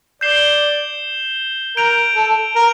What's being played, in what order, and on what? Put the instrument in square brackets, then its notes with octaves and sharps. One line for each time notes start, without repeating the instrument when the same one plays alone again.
[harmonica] D5 [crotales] G6 C7 E7 G7
[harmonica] A#4 [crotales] G6 D7 F7
[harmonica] A4
A#4